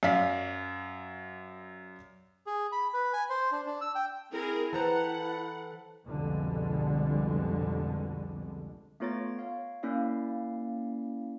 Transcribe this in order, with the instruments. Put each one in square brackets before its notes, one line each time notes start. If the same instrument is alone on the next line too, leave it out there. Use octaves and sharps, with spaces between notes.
[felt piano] F#2 D5 F5 B6
[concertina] G#4
B5
B4
G#5
C5
D4
D4
E6
G5
[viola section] C4 G#4 A#4 [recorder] E4
[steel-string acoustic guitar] E3 C5 A#5 [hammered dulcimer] A4 B4 G5 [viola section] F#5
[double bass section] C2 F2 B2 D3 G3 G#3
[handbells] A3 B3 F4 C#5 A#5 A6
C#5 F5
A#3 C#4 E4 D5 F5